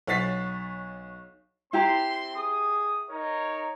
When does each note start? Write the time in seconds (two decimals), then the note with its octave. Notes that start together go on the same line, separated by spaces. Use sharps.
0.07 B1 C#5 F#5 A6 B6 C7
1.73 C4 E4 G4 A#5 C6
2.35 G#4 D#6
3.09 D#4 A#4 C#5